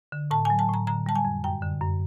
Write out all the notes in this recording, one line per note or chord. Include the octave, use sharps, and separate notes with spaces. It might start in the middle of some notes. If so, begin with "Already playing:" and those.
D3
A2 A5
F#3 G#5
A5
A2
A#5
D3 A#5
G3 A5
G#5
F2
F#2 G5
D3
F#2